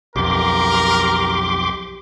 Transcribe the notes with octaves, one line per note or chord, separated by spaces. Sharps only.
B1 F2 G4 A#4 C6 D6